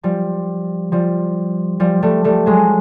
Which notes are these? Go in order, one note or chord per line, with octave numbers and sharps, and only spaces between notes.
F3 G3
F3 G3
F3 G3
G3 A3
G3 A3
F#3 G#3